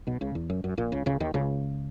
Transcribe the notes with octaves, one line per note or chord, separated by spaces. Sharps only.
B1 B2
C#2 C#3
E2
F#2
F#2
A#1 A#2
C#2 C#3
C#2 C#3
D#2 D#3
C#2 C#3